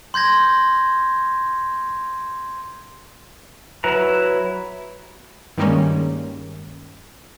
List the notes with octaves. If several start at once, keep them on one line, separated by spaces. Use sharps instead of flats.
C6 G6 G#6 A#6
F#3 E4 B4 A#5
G2 D#3 G3 G#3 A#3 C#4